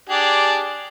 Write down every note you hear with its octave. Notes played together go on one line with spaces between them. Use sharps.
D4 G4 G#4